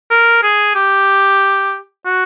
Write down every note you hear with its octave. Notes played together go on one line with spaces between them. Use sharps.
A#4
G#4
G4
F#4